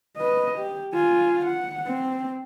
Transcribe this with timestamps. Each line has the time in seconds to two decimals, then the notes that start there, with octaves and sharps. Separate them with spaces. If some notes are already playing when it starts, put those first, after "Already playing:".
0.17 B4 D#5
0.58 G4
0.94 F4 G#5
1.45 F#5
1.87 C4